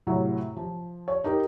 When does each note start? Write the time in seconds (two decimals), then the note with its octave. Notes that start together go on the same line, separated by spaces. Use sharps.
0.07 A2 C3 F#3
0.56 F3
1.08 C#5
1.24 D#4 G4 A#4